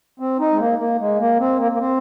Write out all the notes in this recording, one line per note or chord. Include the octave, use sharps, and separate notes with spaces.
C4
D#4
G#3
A#3
A#3
G#3
A#3
C4
A#3
A#3
C4